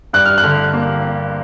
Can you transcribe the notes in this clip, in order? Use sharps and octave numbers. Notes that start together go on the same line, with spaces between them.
G2 F#6
F6
F#6
D3
A#3